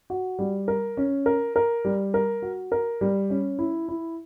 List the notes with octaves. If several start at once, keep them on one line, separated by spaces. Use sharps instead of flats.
F#4
G3
A#4
C#4
A#4
A#4
G3
A#4
F#4
A#4
G3
C#4
E4
E4